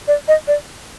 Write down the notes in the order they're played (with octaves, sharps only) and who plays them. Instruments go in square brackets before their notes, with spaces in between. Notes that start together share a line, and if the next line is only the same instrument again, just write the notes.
[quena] D5
D#5
D5